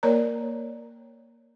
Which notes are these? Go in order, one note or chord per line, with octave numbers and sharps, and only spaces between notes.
A#3 A#4 C#5 D5 A#5